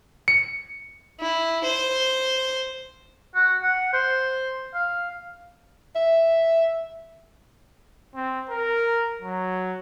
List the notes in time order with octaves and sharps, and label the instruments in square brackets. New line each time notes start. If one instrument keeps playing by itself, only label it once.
[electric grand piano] C#7
[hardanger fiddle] E4
C5
[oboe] F#4
F#5
C5
F5
[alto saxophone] E5
[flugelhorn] C4
A#4
F#3